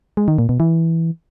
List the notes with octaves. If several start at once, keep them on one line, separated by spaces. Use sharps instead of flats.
G#3
D#3
A#2
B2
E3